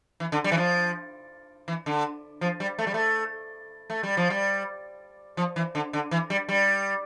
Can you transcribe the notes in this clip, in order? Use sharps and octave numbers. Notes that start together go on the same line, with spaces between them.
E3
D3
G3
E3
F3
E3
D3
F3
G3
A3
G3
A3
A3
G3
F3
G3
F3
E3
D3
D3
E3
G3
G3